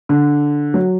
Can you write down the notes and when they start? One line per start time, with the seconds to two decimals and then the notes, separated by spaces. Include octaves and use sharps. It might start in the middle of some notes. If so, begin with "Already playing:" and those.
0.09 D3
0.74 F#3